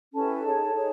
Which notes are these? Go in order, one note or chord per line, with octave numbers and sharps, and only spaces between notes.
C#4 E4 G4 A4 B4 A5
D#4 G#4 C#5
D#4 G#4 C#5